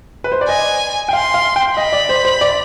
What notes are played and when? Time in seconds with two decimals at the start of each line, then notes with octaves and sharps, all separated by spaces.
0.24 B4
0.32 C5
0.41 D5
0.49 D#5 G#5
1.09 G5
1.13 F5 C6
1.34 F5
1.56 G5
1.77 D#5 B5
1.93 D5
2.09 C5
2.25 C5
2.41 D5